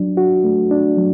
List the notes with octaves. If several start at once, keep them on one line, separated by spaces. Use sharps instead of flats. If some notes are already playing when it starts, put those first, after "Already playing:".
Already playing: F#3 D4
F#4
A3
D4
F#3